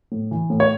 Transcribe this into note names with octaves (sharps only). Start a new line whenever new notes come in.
A2
E3
A2
C#5